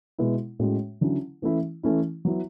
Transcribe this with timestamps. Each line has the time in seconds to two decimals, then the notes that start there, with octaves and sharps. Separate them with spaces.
0.19 B2 G#3 B3 E4
0.60 A2 G#3 C#4 F#4
1.01 D3 F#3 C#4 E4
1.42 E3 A3 C#4 E4
1.83 E3 A3 C#4 E4
2.25 F#3 B3 E4